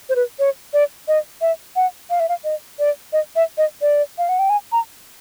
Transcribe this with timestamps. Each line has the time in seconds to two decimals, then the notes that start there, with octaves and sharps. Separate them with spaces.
0.09 C5
0.16 B4
0.39 C#5
0.73 D5
1.08 D#5
1.41 E5
1.76 F#5
2.10 F5
2.20 E5
2.29 F5
2.44 D#5
2.79 D5
3.13 D#5
3.36 E5
3.57 D#5
3.81 D5
4.18 F5
4.29 F#5
4.39 G5
4.49 G#5
4.72 A#5